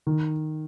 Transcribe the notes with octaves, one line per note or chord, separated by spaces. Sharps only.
D#3